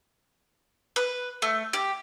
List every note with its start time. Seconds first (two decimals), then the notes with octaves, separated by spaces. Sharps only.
0.96 B4
1.42 A3
1.73 G4